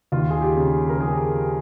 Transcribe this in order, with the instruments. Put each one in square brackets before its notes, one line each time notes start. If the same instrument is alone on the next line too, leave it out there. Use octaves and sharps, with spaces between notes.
[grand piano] D#2 F4
G#4
G4
C#3
A#4
F3 G#4